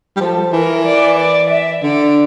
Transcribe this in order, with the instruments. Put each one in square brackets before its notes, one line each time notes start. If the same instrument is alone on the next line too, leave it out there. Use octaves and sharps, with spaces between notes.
[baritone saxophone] G3
[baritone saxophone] F3 [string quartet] A4
[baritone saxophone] E3 [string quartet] A#4
[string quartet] D5
D5
E5
[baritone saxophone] D3 [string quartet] D5